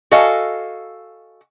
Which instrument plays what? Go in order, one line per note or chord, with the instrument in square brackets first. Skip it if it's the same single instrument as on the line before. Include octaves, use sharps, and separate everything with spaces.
[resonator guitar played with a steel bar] F#4 A4 D#5 F5 G#5